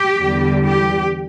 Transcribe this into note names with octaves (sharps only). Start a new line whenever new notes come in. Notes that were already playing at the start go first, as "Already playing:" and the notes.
Already playing: G4
E2 D3 G3
G4